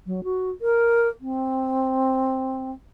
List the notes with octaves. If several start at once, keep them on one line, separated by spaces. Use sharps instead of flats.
F#3
F#4
A#4
C4